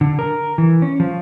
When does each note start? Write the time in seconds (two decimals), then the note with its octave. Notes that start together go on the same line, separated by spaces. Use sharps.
0.01 D3
0.19 A#4
0.58 E3
0.82 C#4
1.00 F3